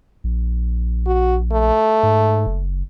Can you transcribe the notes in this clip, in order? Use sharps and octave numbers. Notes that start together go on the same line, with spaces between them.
A#1
F#4
A3
G#2
F#1